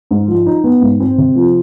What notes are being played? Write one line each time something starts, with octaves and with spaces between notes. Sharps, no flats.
G#2
F3
D#4
B3
G#2
C4
C3
F3